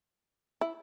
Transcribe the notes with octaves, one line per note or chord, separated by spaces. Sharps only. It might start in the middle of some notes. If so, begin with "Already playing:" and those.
E4